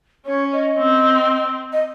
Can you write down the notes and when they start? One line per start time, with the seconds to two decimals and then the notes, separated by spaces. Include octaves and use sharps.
0.26 C#4 C#5
0.52 D#5
0.78 C4
1.72 D#5